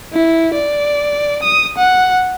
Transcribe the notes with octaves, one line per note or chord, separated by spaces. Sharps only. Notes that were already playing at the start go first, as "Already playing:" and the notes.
E4
D5
D#6
F#5